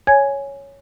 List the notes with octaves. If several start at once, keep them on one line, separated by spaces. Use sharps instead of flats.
C#5 G#5 G#6